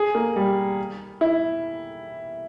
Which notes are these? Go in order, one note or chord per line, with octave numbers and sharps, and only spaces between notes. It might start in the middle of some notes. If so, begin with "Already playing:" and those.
Already playing: G#4
A#3
G3
E4